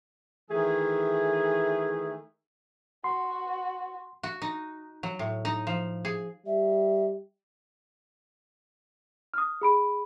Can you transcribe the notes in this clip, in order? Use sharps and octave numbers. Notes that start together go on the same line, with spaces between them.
D#3 E3 A3 G#4
F#4 C6
F#4
D#4
F#3
A2
D#4
F3
G#4
G3 E5
D#6 F6
G#4 B5 D7